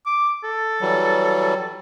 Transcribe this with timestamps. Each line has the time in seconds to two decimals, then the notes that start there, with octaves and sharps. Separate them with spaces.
0.06 D6
0.44 A4
0.81 E3 F#3 G3